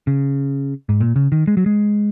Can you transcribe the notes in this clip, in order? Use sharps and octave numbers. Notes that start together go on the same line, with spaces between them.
C#3
G#2
A#2
C#3
D#3
G#3
F#3
G#3